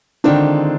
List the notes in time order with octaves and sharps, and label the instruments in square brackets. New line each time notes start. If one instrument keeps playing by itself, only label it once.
[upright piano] D3 D4 [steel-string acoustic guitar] D#3 G#3 C4 F4